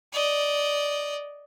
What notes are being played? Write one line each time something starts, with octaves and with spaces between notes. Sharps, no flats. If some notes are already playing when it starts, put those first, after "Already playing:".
D5 D#5